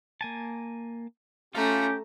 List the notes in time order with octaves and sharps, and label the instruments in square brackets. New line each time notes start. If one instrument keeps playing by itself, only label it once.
[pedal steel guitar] A#3 G#5 A5
[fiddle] A3 A#5 [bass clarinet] C#4 [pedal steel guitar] F4 A4 F5 [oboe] G4